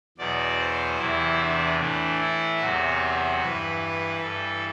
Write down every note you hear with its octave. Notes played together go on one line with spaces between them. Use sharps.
E2 B2 F#3 D5
C5
E2 C3 E3 E4
D4
A2 E3 D4
E4
E2 C3 F#3 F#4
G2 E3 B4
G2 A4
E3